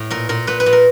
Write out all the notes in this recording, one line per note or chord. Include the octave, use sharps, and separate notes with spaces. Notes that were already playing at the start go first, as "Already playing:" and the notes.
Already playing: A2
A#2 A#4
A#2 A#4
A#2 B4
B4
A#2
A#4